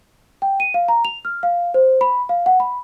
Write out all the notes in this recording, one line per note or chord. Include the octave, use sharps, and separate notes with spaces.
G5
D#7
F5
A#5
F7
F6
F5
C5
B5
F5
F#5
B5